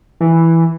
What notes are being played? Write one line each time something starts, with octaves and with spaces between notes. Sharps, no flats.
E3